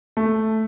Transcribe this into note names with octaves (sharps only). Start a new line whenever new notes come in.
A3